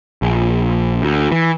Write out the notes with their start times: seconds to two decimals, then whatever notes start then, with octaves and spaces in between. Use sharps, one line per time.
0.22 A#1
1.02 D2
1.32 E3